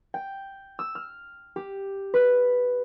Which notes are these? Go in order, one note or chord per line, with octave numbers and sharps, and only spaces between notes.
G5
E6
F6
G4
B4